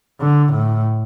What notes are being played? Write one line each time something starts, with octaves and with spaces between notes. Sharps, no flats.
D3
A2